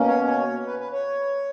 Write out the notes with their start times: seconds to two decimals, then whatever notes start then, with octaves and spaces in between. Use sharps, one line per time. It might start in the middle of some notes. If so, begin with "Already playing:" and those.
Already playing: B2 A#3 C#4
0.08 C#5
0.27 C#5
0.66 B4
0.79 B4
0.92 C#5